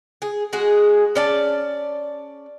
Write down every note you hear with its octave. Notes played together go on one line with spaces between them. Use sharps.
G#4
G#3 F#4 G#4
C#4 D5 A5